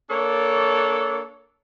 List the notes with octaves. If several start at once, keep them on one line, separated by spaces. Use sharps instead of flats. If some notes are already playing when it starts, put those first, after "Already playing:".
A#3 D4 A4 C#5